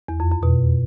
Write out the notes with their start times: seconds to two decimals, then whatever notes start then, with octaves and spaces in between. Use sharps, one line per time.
0.09 E2
0.20 F2
0.31 F2
0.43 B2